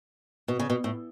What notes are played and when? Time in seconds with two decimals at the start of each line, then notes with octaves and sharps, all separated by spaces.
0.48 B2
0.59 C#3
0.70 B2
0.84 A2